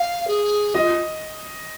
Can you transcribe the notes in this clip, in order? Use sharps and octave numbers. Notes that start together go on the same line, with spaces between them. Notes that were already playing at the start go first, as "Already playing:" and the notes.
Already playing: F5
G#4
F4 D#5